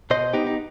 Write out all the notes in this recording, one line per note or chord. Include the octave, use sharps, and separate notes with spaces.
B2 C5 D#5
B3 D#4 G4
D#4